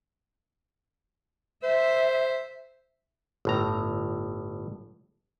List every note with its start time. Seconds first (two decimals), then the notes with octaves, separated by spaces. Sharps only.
1.63 C5 E5
3.45 G1 A2 A#5